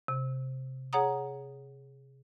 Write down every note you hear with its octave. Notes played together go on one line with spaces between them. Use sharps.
C3
G#4 C#5 F#5 A#5 D#6